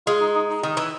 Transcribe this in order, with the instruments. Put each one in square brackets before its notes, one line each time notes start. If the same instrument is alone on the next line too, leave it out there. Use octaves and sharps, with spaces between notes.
[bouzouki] G#3 [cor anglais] F4
[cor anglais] D#4
D#4
D#4
[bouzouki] D#3 [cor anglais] D#4
[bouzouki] E3